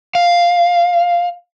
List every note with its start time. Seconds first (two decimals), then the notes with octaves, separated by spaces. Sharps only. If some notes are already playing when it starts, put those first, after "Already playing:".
0.15 F5